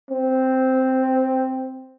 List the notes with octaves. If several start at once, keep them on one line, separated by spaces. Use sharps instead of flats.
C4